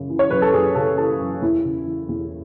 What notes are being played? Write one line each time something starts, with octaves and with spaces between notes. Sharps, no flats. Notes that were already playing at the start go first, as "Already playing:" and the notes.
Already playing: F#2 C#3
E3
C#5
F#2 B4
A4
F#2 G#4
C#3 A4
E3 A4
F#2
E2 E4
C#3
E3
E2